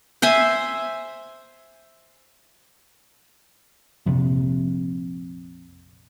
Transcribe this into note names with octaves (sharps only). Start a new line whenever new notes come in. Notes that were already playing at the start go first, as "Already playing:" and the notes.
C5 E5 G#5
A#1 F2 C3